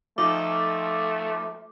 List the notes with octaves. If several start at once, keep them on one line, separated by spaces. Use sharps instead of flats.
F3 A3 D#4 F4 D6